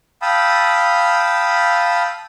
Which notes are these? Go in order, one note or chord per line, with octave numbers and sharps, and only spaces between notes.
F5 G5 A5 B5 D#6 E6